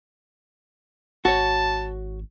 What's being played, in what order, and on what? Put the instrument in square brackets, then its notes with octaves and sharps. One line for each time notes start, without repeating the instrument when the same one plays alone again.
[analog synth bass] G#1 [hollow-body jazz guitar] F#4 C#5 [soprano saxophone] A5